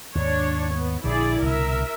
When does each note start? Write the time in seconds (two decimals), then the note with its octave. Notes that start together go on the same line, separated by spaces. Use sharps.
0.15 D#2 G#2 D4 C#5
0.73 B3
1.04 A#1 D3 E4 G#4 D5
1.42 C2 B2 D3 A#4 E5